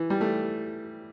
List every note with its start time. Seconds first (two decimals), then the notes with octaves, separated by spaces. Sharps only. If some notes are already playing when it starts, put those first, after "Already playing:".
Already playing: E3
0.10 G3
0.21 A3